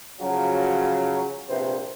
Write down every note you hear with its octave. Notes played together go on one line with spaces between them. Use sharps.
C#3 F3 F#3
A#1 C3 B4 C5